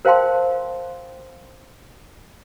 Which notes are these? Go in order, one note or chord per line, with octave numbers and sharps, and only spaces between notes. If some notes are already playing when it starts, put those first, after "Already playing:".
A#4 C5 F5 G5 A5 C6